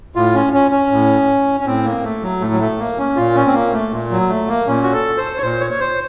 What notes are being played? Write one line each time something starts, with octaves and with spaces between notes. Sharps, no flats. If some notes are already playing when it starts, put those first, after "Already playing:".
A2 F4
C#4
C#4
C#4
A2
C#4
A2 C4
A#3
A3
F#3
A2 A3
F#3
A3
A#3
C#4
A#2 F4
C#4
C4
A#3
A3
A#2
F#3
A3
A#3
A#2 C#4
F#4
A4
C5
C#5
A#2 C5
C#5
C#5
C5